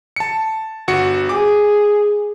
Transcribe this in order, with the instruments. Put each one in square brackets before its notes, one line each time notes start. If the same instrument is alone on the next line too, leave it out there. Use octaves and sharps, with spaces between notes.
[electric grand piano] A5 C#7
G1 F#4 C#7
[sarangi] G#4 [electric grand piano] D6